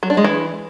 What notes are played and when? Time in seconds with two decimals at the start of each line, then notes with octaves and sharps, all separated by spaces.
0.03 F#3
0.10 D4
0.17 G#3
0.24 E3